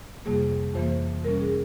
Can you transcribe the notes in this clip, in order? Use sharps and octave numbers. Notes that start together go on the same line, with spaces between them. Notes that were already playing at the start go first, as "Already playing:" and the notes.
F2 C3 G3 A#3 G#4
F2 E3 A#3 C5
C3 G3 C#4 A#4
G#4